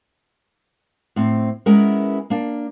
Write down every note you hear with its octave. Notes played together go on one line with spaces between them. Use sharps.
A2 C4
G#3 B3 C#4 E4 A#4
A#3 D4